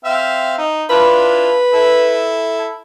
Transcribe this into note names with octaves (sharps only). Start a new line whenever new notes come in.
C4 E5 F5
D#4
D4 E4 F4 B4
E4 A4